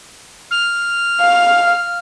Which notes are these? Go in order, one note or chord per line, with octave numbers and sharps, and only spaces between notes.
F6
F5